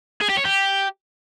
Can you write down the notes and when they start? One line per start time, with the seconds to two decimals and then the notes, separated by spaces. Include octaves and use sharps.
0.22 G#4
0.30 G4
0.37 C#5
0.45 G4